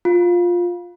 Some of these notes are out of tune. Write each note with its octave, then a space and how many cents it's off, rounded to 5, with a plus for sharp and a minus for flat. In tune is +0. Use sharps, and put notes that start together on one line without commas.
F4 +10